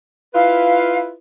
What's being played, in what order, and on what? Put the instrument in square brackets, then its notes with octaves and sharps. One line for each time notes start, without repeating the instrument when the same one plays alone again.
[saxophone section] E4 F4 B4 [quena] F5